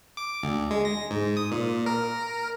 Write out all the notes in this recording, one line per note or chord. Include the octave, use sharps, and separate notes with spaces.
D6
D2
G#3
A#6
G#2
D#6
A#2
A#4